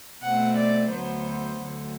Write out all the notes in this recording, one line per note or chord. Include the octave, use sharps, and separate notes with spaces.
B2 A3 C4 F#5
D5
D2 D3 F#3 B3 C5
D2 D3 F#3